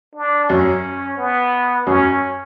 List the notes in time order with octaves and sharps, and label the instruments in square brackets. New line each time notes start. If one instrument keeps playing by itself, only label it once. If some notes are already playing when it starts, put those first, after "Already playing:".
[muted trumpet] D4
[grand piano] F#2 F#3 [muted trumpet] C#4
[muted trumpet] B3
[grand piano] F#2 F#3 [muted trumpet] C#4